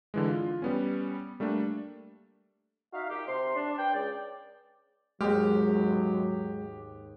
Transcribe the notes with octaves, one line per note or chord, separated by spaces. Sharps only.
D3 E3 G#3
F4
G3 B3 C#4
G3 A3 A#3 D4
D#4 F#4 E5 F5
A#2 D#4 G4
C3 C6
D4
B4 D5 G5
C#2 D5
D#2 G#2 F#3 G#3 G4 F6